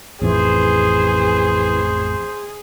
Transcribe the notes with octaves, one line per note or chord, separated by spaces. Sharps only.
A1 F2 E3 G#4 C5